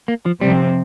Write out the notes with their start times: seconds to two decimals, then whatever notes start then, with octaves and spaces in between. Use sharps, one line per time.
0.08 A#3
0.26 F3
0.41 C3 F3 G3 C4